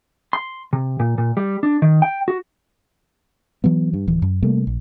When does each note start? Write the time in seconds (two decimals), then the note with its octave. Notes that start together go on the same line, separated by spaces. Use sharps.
0.33 C6
0.73 C3
1.00 A#2
1.18 A#2
1.37 G3
1.63 D4
1.82 D#3
2.02 G5
2.28 F#4
3.64 E3 F#3 B3
3.94 G2
4.08 D1 E3
4.22 F#2
4.42 C3 G3 A3 A#3
4.67 A#1